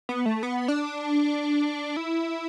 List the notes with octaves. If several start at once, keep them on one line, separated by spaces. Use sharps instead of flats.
B3
A3
B3
D4
E4